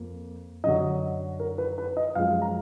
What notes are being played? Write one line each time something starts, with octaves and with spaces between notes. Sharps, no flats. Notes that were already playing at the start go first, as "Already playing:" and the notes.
Already playing: F2 A#3
F#2 D3 F#3 D#5
A#4
B4
B4
D#5
F#2 F3 G#3 F5
A#5